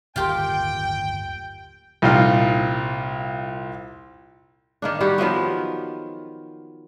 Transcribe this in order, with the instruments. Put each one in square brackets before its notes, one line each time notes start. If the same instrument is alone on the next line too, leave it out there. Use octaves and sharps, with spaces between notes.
[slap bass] D1 G1 D#2 [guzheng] F4 G4 A#4 [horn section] G5
[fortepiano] C2 A#2 D#4 F4 F5
[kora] D#3 A#3 D4
D#3 G3 F#4 G4
D#3 F3 F#3 B3